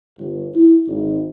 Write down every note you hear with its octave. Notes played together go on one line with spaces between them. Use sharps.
G1
E4
G#1